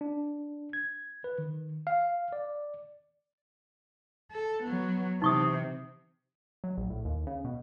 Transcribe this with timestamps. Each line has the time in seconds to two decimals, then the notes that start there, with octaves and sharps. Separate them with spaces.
0.01 D4
0.73 G#6
1.24 B4
1.38 D#3
1.87 F5
2.33 D5
4.31 A4
4.63 F#3 B3
5.22 C3 E3 D#4 C#6 D#6
6.64 F#3
6.77 A#1
6.90 A2
7.05 D#2
7.27 C#3
7.44 B2